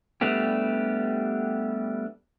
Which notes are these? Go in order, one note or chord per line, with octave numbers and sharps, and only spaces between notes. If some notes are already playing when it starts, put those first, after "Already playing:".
G3 A3 B3 D4 G4